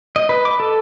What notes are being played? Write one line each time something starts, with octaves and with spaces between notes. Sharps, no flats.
D#5
B4
D6
A4